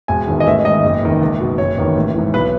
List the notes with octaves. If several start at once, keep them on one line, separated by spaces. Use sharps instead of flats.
E1 G#5
E2 D#3
D#5
A1 E5
G#2 D#3 D#5
F#1
E2 D#3
C#2
B2
F#1 C#5
E2 D#3
A1
G#2 E3
B1 B4